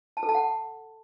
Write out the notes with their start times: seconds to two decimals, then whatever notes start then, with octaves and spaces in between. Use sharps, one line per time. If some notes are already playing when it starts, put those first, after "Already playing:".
0.17 A5
0.23 A4
0.29 A5
0.35 F#5